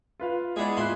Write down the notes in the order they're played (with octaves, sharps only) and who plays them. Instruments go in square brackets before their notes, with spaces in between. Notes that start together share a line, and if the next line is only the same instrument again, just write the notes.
[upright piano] F4 B4 F5
[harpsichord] G#3 B3 D4 [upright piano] E4 [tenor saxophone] G#4
[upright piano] A#2 E5 F#6 [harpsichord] E4 C6